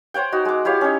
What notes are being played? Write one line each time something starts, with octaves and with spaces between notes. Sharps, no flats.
C5 C#5 F#5 G5
D#4 F#4
G#3 D6
E4 G4 C#5 F5
C#4 D#4